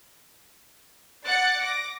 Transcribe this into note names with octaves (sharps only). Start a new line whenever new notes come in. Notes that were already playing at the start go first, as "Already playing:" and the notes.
D5 F#5 F#6 A6 C#7
D6 A#6